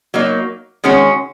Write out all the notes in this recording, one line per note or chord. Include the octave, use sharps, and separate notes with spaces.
F#3 A#3 D#4
D#3 G#3 C#4 F#4